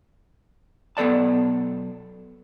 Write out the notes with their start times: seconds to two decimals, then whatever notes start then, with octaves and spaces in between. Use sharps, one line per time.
0.97 B1 B3 A4 D5 A5